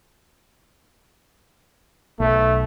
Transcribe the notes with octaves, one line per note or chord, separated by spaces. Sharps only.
B1 A3